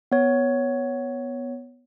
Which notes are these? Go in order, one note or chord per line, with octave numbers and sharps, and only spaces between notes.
B3 C#5